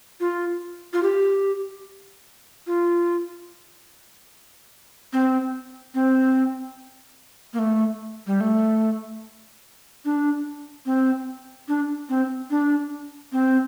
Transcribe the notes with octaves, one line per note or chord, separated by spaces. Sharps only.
F4
F4
G4
F4
C4
C4
A#3
A3
G3
A3
D4
C4
D4
C4
D4
C4